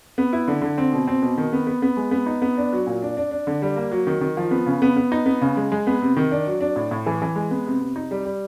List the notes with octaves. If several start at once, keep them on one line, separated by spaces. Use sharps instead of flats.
B3
E4
D3
D3
C4
B2
C4
B2
D#3
B3
B3
B3
G#3
B3
D#4
B3
D4
F#3
A#2
D4
D4
D4
D3
G3
A#3
F#3
D#3
D#3
F3
B3
C#3
B3
B3
D#4
B3
C#3
G#3
G#3
B3
C3
D#3
D4
F#3
D4
A2
A2
E3
E3
G#3
B3
C3
C3
D#4
G3
G3